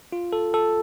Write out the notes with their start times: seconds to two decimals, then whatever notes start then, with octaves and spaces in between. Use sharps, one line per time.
0.12 F4
0.33 A4
0.54 A4